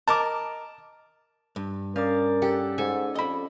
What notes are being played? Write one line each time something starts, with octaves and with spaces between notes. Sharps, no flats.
A#4 D#5 A5 D6
G2
C#4 A#4 D5 F5 D6
G4 A4 F#5
G#2 A4 G#5
F2 D#5 B5